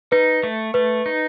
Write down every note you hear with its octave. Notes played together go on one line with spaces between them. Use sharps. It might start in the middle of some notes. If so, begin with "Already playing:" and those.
D#4 B4
A3
A3 B4
D#4